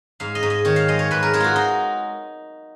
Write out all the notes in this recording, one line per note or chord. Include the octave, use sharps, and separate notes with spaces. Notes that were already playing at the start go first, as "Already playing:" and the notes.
G#2 F5
D#5
G#2
D#5
D#3 C#5
F5
G#3 D#5
C#5
G#2 B4
A#4
G#3 G#4
F4 F#4
D#4